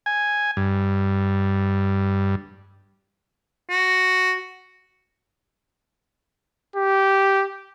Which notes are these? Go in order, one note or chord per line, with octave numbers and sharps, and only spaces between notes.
G#5
G2
F#4
G4